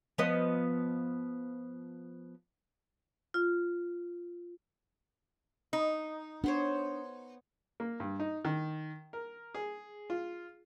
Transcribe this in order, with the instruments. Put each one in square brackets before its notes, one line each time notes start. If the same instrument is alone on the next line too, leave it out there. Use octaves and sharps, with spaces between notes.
[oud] F3 B3 D#5
[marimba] F4
[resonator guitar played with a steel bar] D#4
[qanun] B3 C5 C#5 [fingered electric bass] D4
[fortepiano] A#3
G2
D#4
D#3
A#4
G#4
F4